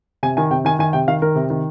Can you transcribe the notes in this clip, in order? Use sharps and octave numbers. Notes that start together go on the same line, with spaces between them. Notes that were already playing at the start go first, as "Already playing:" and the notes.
C3 G#5
D#3 G#5
C3 G5
D#3 G#5
D#3 G#5
C3 G5
D#3 F5
D#3 A#4
C3
D#3